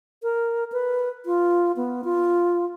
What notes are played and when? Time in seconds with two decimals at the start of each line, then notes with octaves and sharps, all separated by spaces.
0.23 A#4
0.72 B4
1.26 F4
1.76 B3
2.04 F4